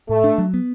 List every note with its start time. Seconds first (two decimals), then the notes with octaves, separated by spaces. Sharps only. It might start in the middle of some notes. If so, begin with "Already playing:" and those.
0.09 A2 A3
0.24 D4
0.38 F#3
0.54 B3